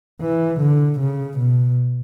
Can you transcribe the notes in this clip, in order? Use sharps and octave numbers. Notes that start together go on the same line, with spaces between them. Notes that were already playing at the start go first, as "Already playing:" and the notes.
E3
D3
C#3
B2